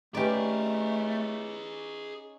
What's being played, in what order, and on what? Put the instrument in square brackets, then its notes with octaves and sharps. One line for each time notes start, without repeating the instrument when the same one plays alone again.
[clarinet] A3 [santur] C#4 D#4 [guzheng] G4 D5 [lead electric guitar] G#4 B4